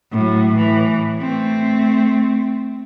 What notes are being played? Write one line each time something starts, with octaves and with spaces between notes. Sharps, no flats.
A2 F#3
A2 E3
A3 C4